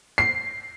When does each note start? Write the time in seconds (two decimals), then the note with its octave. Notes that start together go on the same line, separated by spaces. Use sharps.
0.18 C7